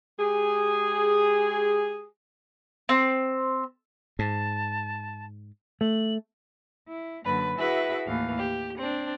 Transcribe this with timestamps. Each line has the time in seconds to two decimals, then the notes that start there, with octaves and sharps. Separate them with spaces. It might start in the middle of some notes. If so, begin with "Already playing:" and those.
0.19 G#3 G4 G#4
2.89 C4
4.19 G#2 A5
5.81 A3 F#7
6.89 E4
7.24 F#2 D3 A#3 B4
7.57 E4 F#4 G#4 B4 E5
8.06 D#2 A2 E3 F5
8.36 G4
8.78 C4 D4